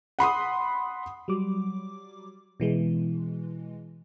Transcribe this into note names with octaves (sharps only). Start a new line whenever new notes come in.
F#5 B5 C6 D#6
F#3 G3 D6
B2 E3 G#3